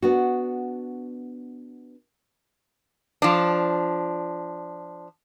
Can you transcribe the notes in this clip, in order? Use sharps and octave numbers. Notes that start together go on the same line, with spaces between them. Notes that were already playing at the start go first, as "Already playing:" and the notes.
B3 D4 F#4
F3 D4